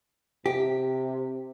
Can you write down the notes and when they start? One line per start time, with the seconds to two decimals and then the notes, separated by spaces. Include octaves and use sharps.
0.46 C3 G4